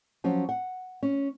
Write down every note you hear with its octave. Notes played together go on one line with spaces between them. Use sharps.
F3 F#3 C#4
F#5
C#4